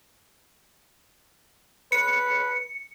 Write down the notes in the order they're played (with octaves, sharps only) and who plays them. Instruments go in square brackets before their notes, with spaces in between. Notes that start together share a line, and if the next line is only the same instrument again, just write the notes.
[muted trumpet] B4 [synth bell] C#7